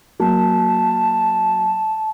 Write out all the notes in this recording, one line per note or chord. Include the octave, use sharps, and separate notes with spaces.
F#3 A#3 A5